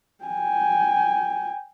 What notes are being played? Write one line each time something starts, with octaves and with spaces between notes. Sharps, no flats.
G5 G#5